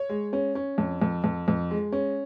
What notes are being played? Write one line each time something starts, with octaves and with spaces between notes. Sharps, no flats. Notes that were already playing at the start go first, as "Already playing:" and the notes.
Already playing: C#5
G#3
C#4
C#4
F2
F2
F2
F2
G#3
C#4